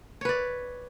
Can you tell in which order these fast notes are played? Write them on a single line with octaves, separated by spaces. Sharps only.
C#5 B4 D5